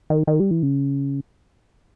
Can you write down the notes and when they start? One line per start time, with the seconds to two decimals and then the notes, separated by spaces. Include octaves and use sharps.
0.10 D#3
0.27 D#3
0.40 G3
0.51 E3
0.63 C#3